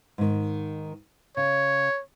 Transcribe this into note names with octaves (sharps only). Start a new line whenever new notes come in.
G#2 D#3
C#3 C#5